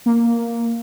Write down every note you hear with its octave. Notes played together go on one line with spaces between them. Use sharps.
A#3